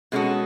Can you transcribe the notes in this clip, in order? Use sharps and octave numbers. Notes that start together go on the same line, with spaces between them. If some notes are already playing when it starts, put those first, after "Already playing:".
B2 G#3 C#4 F#4 A4